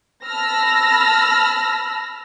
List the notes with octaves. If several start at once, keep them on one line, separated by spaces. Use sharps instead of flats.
A5 B5 E6 F6 A#6